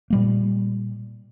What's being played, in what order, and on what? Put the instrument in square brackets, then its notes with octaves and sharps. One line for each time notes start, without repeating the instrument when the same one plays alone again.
[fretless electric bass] A#2 G3 A#3